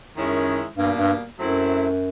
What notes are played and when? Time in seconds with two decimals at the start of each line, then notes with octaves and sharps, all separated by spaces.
0.16 F#2 D#3 G#3 C#4 E4
0.77 G2 B2 G3 A#3
0.98 G2
1.38 F#2 F#3 A3 C4 E4